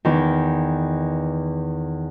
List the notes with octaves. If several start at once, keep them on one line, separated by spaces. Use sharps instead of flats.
E2 D#3